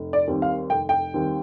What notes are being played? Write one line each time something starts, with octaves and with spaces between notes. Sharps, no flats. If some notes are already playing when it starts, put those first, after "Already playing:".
Already playing: F1
D5
D#2 D#3 G3 C4
F5
F1 G5
G5
D#2 D#3 G3 C4